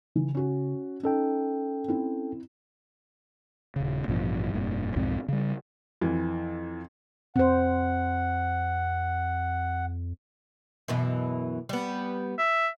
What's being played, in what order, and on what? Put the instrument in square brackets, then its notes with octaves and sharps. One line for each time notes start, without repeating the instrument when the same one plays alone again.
[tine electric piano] C#3 [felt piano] E3
[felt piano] C#4 F#4
[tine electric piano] C#4 A4 G5 [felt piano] D#4
[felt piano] C4 E4
[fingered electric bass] D#1 C#3
A1 G2 B2 F3
F1 G2 A#2
B1 F2 G#2 C4
C#3 G3
[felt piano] F2 E3
[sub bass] F2 [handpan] C4 C5 [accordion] F#5
[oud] F#2 B2 E3
G3 B3
[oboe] E5